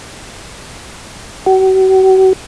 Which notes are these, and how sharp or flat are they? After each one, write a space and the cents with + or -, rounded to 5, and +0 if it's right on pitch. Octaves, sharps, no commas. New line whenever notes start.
F#4 +40